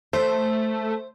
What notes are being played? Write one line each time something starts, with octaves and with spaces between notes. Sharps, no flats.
A3 C5